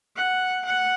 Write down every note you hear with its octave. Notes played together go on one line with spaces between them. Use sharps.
F#5
F#5